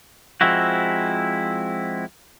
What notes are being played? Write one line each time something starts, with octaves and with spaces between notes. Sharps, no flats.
F3 G#3 C4 E4 F#4